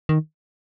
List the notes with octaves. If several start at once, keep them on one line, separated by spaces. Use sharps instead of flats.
D#3